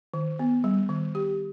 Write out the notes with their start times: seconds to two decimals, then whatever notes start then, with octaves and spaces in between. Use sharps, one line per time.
0.14 D#3
0.39 B3
0.64 G3
0.89 D#3
1.15 G4